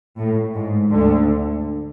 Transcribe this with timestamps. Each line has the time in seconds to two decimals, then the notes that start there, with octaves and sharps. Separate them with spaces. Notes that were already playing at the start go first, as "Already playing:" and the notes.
0.18 A2
0.55 G#2
0.92 D2 D3